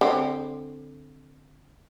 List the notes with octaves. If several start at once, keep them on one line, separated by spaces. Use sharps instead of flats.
D3 C4